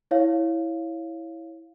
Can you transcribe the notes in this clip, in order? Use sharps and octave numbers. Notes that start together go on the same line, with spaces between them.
E4 C#5 F5